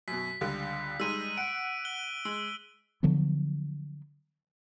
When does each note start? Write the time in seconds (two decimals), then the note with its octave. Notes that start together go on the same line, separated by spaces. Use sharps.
0.08 F#2 B2 B6
0.41 C#2 D3 G3
1.00 G3 G#3 D#4 E6 F#6 D#7
1.37 F#5 D7
1.85 F#6 G7
2.25 G#3 E6
3.03 D3 F3 F#3 B3